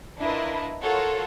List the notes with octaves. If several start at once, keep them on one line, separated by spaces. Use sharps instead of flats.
D4 E4 F4 A#4 B4 D#5
F4 F#4 A4 A#4 C#5 F#5